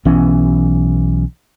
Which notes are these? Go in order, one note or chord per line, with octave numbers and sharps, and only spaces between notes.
B1 E3 B3 C#4